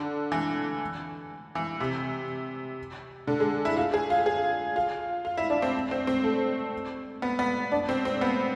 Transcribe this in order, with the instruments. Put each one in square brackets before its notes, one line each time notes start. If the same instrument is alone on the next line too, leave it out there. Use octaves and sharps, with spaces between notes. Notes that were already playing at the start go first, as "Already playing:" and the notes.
Already playing: [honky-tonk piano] D3
E3
E3
C3
D3
G#3
E4
F4
G#4
F4
G#4
F4
F4
E4
D4
C4
C4
C4
A3
B3
B3
D4
C4
C4
B3